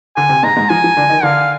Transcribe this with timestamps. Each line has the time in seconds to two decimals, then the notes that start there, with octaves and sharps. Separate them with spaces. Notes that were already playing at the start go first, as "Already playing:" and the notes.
0.16 D3 D4 G#5
0.29 C3 C4
0.43 G#2 G#3 A#5
0.57 G#2 G#3
0.69 F3 G#5
0.84 F3
0.97 D3 D4
1.09 D#3 D#4
1.23 D3 D4 F5